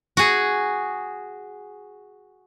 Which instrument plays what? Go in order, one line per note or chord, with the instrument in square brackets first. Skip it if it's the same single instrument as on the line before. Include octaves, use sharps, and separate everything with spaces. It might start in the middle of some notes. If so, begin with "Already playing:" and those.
[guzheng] F#4 G#4